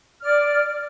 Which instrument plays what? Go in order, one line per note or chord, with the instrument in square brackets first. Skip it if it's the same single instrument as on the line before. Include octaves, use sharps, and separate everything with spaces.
[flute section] D5 F6